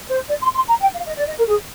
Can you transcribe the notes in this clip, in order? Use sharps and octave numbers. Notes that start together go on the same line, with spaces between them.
C5
D5
C6
C6
A#5
G5
F5
D#5
D5
D#5
A#4
G#4